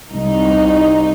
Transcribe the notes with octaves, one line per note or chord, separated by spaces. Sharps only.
C2 D#4